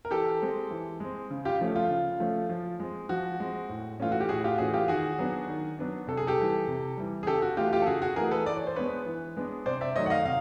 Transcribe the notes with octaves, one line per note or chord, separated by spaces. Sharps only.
A#4
E3 G4 A4
G#3 C4
E3
G#3 C4
C#3
F4 G4
F3 A3 C#4
F4
C#3
F3 A3 C#4
F3
G#3 C4
F3 F#4
G#3 C4
A2
E3 A3 C#4 F4
F#4
G4
A2 F#4 G#4
F4 G4
E3 A3 C#4 F#4 G#4
F4 G4
D#3 F#4 G#4
F#3 B3 D4
D#3
F#3 B3 D4
C3 A4
G#4
G4 A4
E3 G3
C3
E3 G3
G#4
C#3 G4 A4
F#4
E3 A3 F4 G4
F4 G4
A4
C#3 F#4 G#4
F#4 G#4
E3 A3 G#4 A#4
A4 B4
E3 D5
C#5
C5
G#3 B3 D4 B4 C#5
E3
G#3 B3 D4
C3 C5 D5
D5 E5
D#3 F#3 A3 C#5 D#5
F#5
D#5 F5
C3 F5